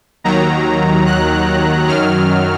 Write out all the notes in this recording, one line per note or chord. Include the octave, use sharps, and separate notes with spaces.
D#2 D#3 F#3 A#5
F#6
F#2 D#3 F#3 F6